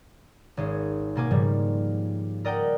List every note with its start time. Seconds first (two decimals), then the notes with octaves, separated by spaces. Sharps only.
0.57 G#1 C#4 G#4
1.16 B2 A#3 G#5 D6
1.31 G#2 C#3 F3 G3
2.45 A#4 D5 D#5 F#5 G5 A#5